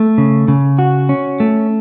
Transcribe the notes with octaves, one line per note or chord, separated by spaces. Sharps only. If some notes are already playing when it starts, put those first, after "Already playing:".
Already playing: A3
C#3
C#3
F#4
C#4
A3